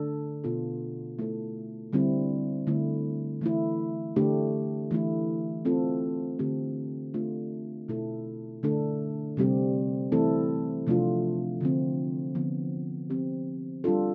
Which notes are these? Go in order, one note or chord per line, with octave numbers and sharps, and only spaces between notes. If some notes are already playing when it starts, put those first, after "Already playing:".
Already playing: D3 A3 D4 A4
B2 B3 F4 A4
A3 E4 A4
D3 G3 C4 E4
D3 A3 E4
E3 A3 E4
D3 A3 D4 G4
E3 A3 E4
A3 C4 F4 A4
D3 A3 C4 G4
A3 D4 F4
B2 A3 E4 A4
D3 A3 D4 A4
C3 G3 C4 G4
E3 A3 C4 E4 A4
C3 F3 A3 D4 F4
D3 F3 C4
D3 F3 B3
F3 C4 G4
G3 D4 F4 A4